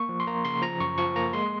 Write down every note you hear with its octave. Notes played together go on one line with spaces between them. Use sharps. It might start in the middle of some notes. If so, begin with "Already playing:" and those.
Already playing: A#3 C#6
F3
C6
A#3 A#5
C#3 C6
F3 A#5
F#2 C#6
F3 C#6
A#3 A#5
G#3 C6